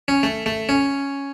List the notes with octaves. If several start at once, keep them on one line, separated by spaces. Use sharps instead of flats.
C#4
A3
A3
C#4